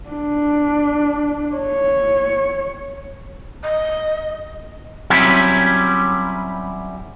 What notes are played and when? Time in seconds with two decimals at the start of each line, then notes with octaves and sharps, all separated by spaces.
0.10 D4
1.57 C#5
3.63 D#5
5.10 F#3 G3 C4 C#4 E4 G4